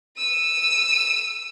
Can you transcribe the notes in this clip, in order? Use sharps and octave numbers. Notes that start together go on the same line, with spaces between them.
E6 D#7